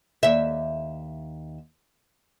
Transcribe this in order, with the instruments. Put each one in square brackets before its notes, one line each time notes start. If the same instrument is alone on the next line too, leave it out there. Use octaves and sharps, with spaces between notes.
[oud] D#2 E5